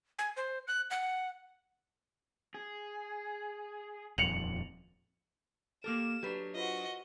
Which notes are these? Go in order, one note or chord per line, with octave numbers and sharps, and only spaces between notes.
G#5
C5
F#6
F#5
G#4
D#1 F2 C#7 F7 F#7
A#3 G4 A4 A#4 F6 E7
F#3 D4 G4 B4
F4 F#4 B4 C5 D#5